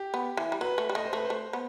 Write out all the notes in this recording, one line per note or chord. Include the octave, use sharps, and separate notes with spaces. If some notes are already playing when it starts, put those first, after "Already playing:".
Already playing: G4
B3
E3
G3
F#3 B4
A3
G3
A3 D#5
C5
A3 B4
C5
A3
B3